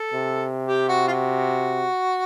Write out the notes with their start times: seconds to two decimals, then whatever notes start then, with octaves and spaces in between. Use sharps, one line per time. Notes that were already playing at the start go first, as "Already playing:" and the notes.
Already playing: A4
0.11 C3
0.67 G4
0.89 F#4
1.07 F4
1.12 F#4